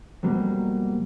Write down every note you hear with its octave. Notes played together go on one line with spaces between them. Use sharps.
F2 B2 F#3 G3 A#3